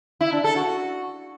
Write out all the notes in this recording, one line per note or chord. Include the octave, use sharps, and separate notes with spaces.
E4
D4
A4
F#4